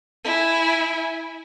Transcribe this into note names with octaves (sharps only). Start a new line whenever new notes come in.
E4 G#5